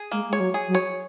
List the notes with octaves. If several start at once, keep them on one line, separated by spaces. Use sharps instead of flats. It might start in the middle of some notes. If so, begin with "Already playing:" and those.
Already playing: G#4
G#3 A#3
G#3 C#5
F#3
G#4
F#3
C#5